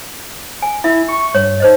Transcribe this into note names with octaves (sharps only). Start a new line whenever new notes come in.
G#5
E4 F4 E5
C#6
G2 C#5
D#4 C5 D#5